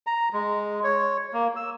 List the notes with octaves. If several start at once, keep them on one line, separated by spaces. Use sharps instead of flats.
A#5
G#3
C#5
A#3
E6